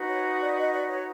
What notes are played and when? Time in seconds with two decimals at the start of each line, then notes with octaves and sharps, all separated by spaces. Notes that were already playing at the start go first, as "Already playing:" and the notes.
Already playing: D#4 F#4 B4
0.09 C#5
0.41 D5
0.57 D#5
0.72 D5
0.89 C#5